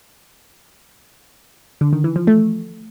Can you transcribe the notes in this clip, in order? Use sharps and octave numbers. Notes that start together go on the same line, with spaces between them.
D3
D#3
E3
F3
A3